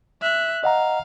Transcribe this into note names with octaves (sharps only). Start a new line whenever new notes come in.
E5 F#6
D#5 F5 F#5 A#5